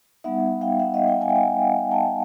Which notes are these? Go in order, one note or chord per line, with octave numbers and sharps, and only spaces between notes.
G3 B3 D#4 E5 F#5
F5 G5
E5 F#5
D#5 F5
F#5
F5 G5
F#5 G#5
G5
F#5 G#5
G5 A5